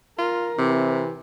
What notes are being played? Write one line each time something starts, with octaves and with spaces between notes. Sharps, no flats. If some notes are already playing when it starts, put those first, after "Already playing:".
F4 A#4
C3 E3 C4